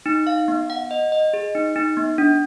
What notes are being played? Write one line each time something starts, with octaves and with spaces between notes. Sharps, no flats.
D#4
F5
B3
F#5
D#5
D#5
G#4
D#4
D#4
B3
D4